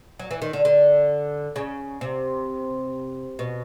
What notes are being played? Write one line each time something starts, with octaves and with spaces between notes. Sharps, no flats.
F#3
E3
D#3
D3
D3
C#3
C3
B2